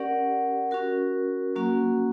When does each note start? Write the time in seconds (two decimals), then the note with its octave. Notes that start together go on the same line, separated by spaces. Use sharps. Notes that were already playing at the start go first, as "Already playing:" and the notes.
Already playing: C#4 G4 A#4 D5 F#5
0.71 C#4 F#4 A#4
1.56 F#3 A#3 C#4 F#4